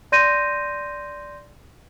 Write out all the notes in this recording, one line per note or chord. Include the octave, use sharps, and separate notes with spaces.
D5 C6 G6 A#6 D#7